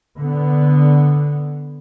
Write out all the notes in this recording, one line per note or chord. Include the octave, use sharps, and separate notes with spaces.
D3 B3